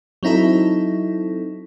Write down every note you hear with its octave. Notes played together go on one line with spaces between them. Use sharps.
F#3 C4 D#4 E4 A4